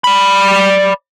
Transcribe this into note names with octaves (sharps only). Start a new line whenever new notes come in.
D5 B5